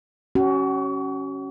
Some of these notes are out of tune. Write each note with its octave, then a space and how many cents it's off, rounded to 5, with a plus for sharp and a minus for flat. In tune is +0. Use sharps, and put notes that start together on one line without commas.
C#4 -5 F#4 +35